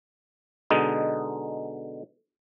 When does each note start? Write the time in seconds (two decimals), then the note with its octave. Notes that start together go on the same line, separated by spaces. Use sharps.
0.70 B2 D3 G#3 D#4